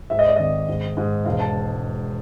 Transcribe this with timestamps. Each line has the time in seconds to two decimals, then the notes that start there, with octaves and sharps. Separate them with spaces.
0.10 G#2 E5
0.19 D#5
0.27 D5
0.36 G#1 D#5
0.68 G#2
0.97 G#2
1.25 E1 F5
1.40 A5